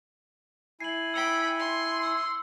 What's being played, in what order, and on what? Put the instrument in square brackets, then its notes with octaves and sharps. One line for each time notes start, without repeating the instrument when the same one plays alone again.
[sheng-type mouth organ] E4 G#5 [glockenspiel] C7 F#7
[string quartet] G5 B5 [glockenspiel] E6 C#7 G7
[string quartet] C6
[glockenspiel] E6